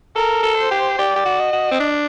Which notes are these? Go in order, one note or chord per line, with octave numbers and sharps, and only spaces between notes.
A4 A#4
A4
C5
G4
G4 D5
G4
F#4
D#5
F#4
C4
D4